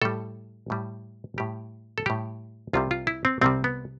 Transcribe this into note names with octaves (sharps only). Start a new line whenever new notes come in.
A2 G3 A4
A2 G3
A2 G3 G4
A4
A2 G3 G4
C2 C3 G3 F4
F4
E4
C4
C2 C3 G3 C4
B3